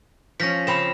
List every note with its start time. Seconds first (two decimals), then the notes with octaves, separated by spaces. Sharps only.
0.40 F3 C#4 A#6 B6
0.67 C#3 C4 B5 E7